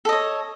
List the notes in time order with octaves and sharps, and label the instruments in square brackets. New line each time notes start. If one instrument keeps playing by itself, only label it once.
[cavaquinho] A4
D#5
C#5